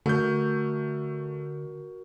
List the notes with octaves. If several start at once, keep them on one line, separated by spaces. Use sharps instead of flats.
D3 A3 F#4 A#4 G6